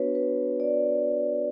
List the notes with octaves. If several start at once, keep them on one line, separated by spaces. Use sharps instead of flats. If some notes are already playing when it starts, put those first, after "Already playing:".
Already playing: B3 D4 F#4 B4 C#5
B4
D5